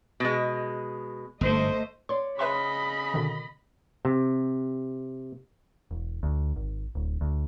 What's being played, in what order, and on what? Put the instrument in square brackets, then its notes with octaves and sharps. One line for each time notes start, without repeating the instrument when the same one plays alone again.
[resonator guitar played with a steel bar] B2 G#3
[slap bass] G1 G#2 [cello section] A3 C5 D#5
[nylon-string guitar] C#5 D5 [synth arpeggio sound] C6
[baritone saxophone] C#3 [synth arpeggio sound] B4 E5 C6 [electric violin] D#5 B5
[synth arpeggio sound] B2 D3 D#3
[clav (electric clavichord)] C3
[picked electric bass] E1
D2
G#1
D1
D2